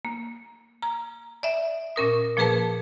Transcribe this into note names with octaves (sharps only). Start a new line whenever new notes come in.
A#3
A#5
D5 E5
A#2 C#4 A#4 D#6
A#2 F3 A#3 G#4 B4 A5